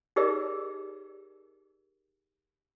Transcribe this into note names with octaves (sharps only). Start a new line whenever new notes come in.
D#4 G4 G#4 A#4 D5